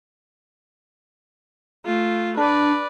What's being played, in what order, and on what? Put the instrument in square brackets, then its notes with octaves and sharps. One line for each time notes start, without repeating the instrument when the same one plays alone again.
[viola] A3 F4
[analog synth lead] D4 [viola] B4 D5